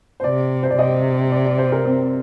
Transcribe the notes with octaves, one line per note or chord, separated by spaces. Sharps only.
C5
C3 D5
C5
D5
C3 D#5
D5
D5
C5
A#4
C4